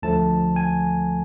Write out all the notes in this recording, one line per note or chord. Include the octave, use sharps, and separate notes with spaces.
D2 D3 F3 A3 A5
G#5